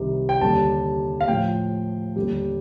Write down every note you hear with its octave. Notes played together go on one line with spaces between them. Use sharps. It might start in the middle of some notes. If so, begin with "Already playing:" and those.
Already playing: C2 C3 D#3 G3
G5
D#2 D3 G3 A5
F5
A2 F3 G5
D#2 D3 G3